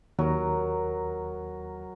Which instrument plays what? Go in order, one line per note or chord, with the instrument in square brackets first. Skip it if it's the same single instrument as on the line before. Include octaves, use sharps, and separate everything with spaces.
[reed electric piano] D#2 [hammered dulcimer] F#3 A#4